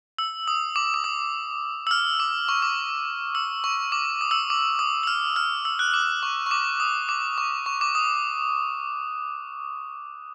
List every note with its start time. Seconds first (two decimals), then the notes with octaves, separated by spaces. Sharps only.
0.19 E6
0.48 D#6
0.76 D6
0.94 D6
1.04 D#6
1.87 E6
1.91 F6
2.20 D6
2.49 C#6
2.62 D6
3.35 E6
3.64 C#6
3.92 D6
4.21 D#6
4.31 E6
4.50 D6
4.79 D#6
5.03 E6
5.07 F6
5.36 F6
5.65 E6
5.79 F#6
5.94 D6
6.23 C#6
6.46 C#6
6.51 D6
6.80 D#6
7.09 D6
7.38 C#6
7.66 C#6
7.81 D6
7.95 D#6